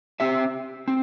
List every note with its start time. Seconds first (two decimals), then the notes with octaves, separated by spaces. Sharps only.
0.20 C4 G4 E5
0.88 C4